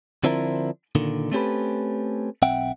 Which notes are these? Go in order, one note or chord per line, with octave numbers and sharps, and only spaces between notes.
D3 F3 C4 D4 E4 A#4
A#2 D3 D#3
A3 C4 C#4 G4 A4 B4
B1 C4 E5 F#5 G5